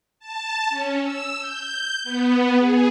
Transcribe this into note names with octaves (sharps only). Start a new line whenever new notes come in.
A5
C#4
E6
G6
B3
G#4